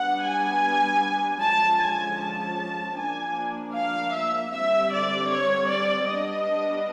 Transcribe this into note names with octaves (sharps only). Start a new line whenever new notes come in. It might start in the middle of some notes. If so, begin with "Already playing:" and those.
Already playing: G3 B3 D4 F#5
G#5
D3 F3 G#3 C#4 A5
G#5
A5
F3 A#3 D4 G#5
F5
E5
D3 G3 C4 E5
D5
C#5
D5
G3 B3 D4 D#5